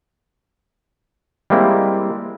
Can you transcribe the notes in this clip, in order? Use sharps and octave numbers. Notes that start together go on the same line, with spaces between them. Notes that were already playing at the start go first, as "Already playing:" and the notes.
G3 G#3 A#3 C4 E4